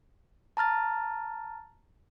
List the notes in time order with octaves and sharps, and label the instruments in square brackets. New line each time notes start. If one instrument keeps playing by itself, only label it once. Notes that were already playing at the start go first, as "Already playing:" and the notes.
[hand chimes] A5 A#5 F6 A6